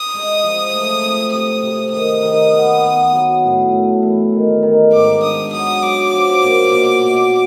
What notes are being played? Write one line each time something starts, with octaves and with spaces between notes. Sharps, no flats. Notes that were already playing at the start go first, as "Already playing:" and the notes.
Already playing: D#6
G#3
F3
A3
C4
C3 D#6
C3
D#3 D#6
D#3
B3
B3
F#3
A2
A3
E3
D#3
D#3
G#2 D6
D4 D#6
F#3 D#6
F#3 D6
F3
A#2
B2
B2